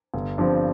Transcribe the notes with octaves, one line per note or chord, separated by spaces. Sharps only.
G1
G2 F3 C4